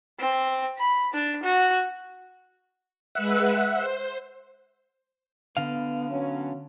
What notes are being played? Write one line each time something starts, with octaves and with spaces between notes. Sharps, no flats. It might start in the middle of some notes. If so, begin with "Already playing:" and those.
C4
B5
D4
F#4
G#3 B4 E5 F#5
C5
D3 B3 F5
F#3 B3 C#4